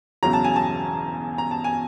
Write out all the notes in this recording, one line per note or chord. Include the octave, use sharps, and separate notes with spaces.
E1 E2 C#3 F#3 A#5
A5
G#5
A5
A#5
A5
G#5